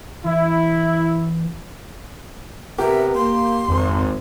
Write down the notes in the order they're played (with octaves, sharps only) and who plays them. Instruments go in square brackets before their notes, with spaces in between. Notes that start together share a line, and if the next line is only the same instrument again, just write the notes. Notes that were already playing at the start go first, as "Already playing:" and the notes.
[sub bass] E3 [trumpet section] E4
[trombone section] C3 B3 A#4 [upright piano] G4 [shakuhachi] E5
[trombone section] A#3 [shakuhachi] C6
[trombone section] G#1 [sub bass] F2